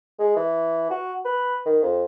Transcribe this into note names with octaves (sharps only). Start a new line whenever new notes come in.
G#3
E3
F#4
B4
D#3
F2